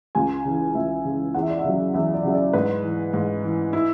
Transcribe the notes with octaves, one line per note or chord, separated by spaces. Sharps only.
C#2 G#5
C#3 E3
C#2 E5
C#3 E3
E2 F#5
E5
D5
E5
C#3 F#3
E2 E5
D5
C#3 F#3 E5
D5
G#2 B4
E3
G#2
E3
E4